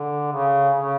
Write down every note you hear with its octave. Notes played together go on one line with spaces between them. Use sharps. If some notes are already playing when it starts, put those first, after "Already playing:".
Already playing: D3
C#3
C#3